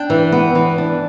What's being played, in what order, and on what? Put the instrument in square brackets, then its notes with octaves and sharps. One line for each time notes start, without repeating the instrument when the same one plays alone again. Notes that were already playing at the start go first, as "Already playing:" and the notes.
Already playing: [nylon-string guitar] D4 G5
E3
B3
E3
D4